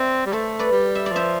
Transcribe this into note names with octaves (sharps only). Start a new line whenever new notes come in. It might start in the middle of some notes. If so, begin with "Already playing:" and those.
Already playing: C4 C5 D5 E5
G3
A3 A4 C5
B4 D5
G3
E5
D5
F3 C5 E5